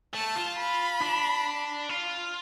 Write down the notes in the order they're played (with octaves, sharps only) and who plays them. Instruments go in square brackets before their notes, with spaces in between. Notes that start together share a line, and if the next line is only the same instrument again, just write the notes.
[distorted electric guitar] A3 [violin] A5
[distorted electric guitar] F4
[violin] B5
[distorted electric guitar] D4
F4